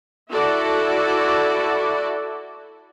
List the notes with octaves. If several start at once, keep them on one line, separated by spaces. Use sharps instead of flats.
E4 F#4 A4 D5